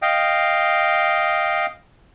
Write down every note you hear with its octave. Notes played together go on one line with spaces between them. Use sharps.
D#5 F5 G5